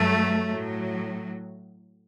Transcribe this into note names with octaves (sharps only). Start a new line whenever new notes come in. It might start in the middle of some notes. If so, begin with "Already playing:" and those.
Already playing: G2 F#3 A3
A2 F#3